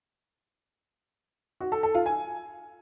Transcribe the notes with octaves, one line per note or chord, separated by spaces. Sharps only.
F#4
A4
A4
F4
G#5